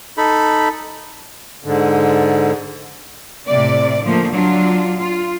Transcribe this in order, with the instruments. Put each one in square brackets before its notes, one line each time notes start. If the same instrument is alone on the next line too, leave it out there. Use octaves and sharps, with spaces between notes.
[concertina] D#4 A4 B5
[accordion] G#2 D3
[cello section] A2 C3 D5
D3 F3 A3 A#3
F#3 D4 F4
F4